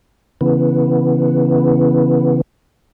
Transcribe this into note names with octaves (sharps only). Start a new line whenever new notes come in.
C#3 E3 B3